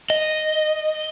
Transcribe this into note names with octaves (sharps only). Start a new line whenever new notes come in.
D#5